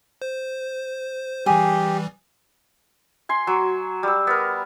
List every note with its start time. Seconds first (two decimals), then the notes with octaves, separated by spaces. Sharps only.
0.22 C5
1.46 E3 G3 G4 G#4
3.29 G#5 C6
3.47 F#3
4.03 G3 E6
4.27 B3 A#4